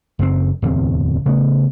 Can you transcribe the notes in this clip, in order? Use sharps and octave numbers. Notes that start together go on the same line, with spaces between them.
F#1 F#2 C#3 C4
D1 E2 C3 C4
C#3 A3 B3